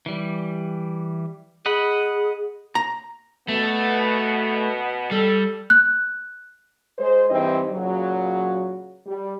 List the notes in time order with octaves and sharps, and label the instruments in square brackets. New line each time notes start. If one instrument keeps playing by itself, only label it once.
[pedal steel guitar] E3 G3
[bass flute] G#4 [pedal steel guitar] D#5 F#5 B5
[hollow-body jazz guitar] A#5
[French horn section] B2 B3 [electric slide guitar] A3
[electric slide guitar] G3 [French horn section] A4
[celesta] F#6
[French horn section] G#3 C5
G2 E3 C4 D#4 D#5
A#2 C#3 F#3
G3